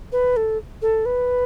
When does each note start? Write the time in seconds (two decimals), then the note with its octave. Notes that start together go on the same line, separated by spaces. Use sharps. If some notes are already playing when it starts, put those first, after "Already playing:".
0.12 B4
0.36 A4
0.82 A4
1.05 B4